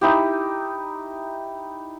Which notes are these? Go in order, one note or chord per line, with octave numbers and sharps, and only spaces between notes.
D#4 E4 G4